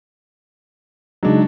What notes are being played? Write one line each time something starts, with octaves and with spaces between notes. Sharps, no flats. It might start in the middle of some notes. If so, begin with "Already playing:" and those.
C#3 F#3 G#3 D4 D#4